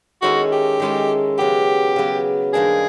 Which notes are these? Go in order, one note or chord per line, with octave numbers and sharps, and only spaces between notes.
D#3 G#3 C#4 E4 F#4 A4
G4
D#3 G#3 C#4 E4 A4
C#3 F#3 B3 G4
C#3 F#3 B3
F#2 D#3 G3 A#3 D4 G#4